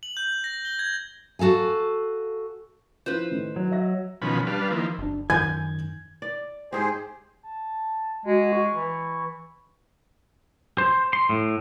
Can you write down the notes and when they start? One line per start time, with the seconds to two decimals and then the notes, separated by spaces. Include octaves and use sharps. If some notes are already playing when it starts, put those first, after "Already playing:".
0.03 F#7
0.17 G6
0.44 A#6
0.65 G7
0.79 G#6
1.39 F#4 A4 F5 G#5
3.06 F3 E4 B4 C5
3.31 A2 D#3
3.56 F#3
3.71 D#5 E5 A#6
4.22 B2 D#3 F3 C#4 B5
4.47 G3 D4 B4 F5
4.71 D#3 F3 A#3 E4
4.99 F#1 D4
5.30 F#2 D#3 G#5 G6 G#6
6.22 D5
6.72 G#2 G4 G#4 C5
7.43 A5
8.26 G#3 F#4
8.53 C#6
8.74 E3
10.78 C5
11.13 C6
11.29 A2